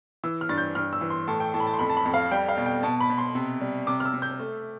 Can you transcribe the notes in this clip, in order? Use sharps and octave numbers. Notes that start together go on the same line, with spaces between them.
E3 E6
F6
G2 A6
G6
G2 F6
E6
E3
C6
A2 A5
G5
A2 A5
B5
A5
C6
F2 B5
A5
B5
F2
F5
G3 G5
F5
B2
G5
B2 A5
B5
B2
C6
C3
G3
C3 D6
F6
E6
C3
G6
A3